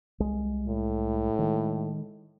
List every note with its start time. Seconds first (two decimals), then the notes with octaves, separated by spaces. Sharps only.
0.20 C2 G#3
0.67 A2
1.39 D#3 G#3